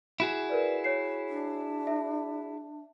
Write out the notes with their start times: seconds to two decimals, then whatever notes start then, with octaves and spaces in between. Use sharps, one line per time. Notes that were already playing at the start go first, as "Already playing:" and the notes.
0.20 E4 F#4 G#4
0.49 A#4 B4 D5
0.84 C#5 C7
1.28 D4
1.87 E5